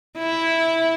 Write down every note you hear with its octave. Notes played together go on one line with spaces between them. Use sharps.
E4